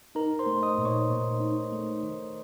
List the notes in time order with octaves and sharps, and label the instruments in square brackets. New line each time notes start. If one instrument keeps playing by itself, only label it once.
[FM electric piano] D#4 [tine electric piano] A#4 A#5
[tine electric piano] C5 C6
[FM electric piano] A3
[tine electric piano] D#5 D#6
[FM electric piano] A#2
[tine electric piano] C#5 C#6
[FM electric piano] A#2
D#4
A3
D#3